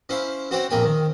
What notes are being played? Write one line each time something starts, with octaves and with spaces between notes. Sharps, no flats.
C#4 E4 C5 F5
C4 F#4 C5 C#5 F#5 G5
A#1 F2 A#3 A#4 G5 G#5
D#3